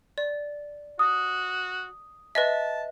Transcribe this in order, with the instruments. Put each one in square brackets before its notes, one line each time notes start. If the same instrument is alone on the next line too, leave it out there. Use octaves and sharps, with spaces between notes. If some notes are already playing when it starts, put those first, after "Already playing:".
[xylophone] D5
[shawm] F#4 [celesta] D#6
[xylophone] B4 D#5 E5 [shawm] A5